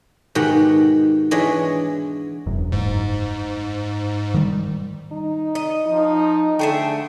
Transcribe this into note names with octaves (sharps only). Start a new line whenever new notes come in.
G#2 B2 D#3 G4 F#5
E3 G#3 B3 D4 C#5 D#5
E1 F#2
F#1 G#2
D#3 G3
D#4
D#5
F3 D#4
D3 A3 G#4 E5 G5